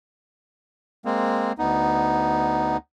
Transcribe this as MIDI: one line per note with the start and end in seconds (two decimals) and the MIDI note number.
1.05 1.52 56
1.05 1.52 58
1.05 1.52 60
1.58 2.77 38
1.58 2.77 59
1.58 2.77 63